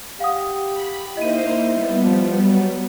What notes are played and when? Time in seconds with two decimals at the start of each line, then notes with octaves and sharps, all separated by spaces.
0.20 G4 F5 F#5 D#6
0.64 B5
1.17 A#3 D#4 E4 C5 D#5 D#7
1.70 G3 B3
2.02 F3
2.43 F#3